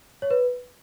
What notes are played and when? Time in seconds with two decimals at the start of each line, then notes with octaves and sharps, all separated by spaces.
0.22 C#5
0.31 B4